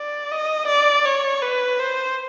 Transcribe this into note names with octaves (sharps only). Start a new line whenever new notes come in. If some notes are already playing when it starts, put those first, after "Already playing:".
Already playing: D5
D#5
D5
C#5
B4
C5